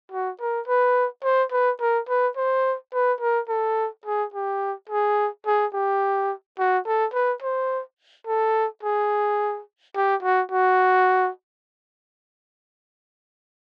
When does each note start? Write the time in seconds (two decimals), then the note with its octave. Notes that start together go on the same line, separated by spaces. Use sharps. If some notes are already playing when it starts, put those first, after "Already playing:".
0.12 F#4
0.41 A#4
0.68 B4
1.24 C5
1.52 B4
1.80 A#4
2.09 B4
2.37 C5
2.94 B4
3.20 A#4
3.49 A4
4.06 G#4
4.34 G4
4.89 G#4
5.46 G#4
5.73 G4
6.59 F#4
6.86 A4
7.14 B4
7.42 C5
8.27 A4
8.83 G#4
9.96 G4
10.23 F#4
10.52 F#4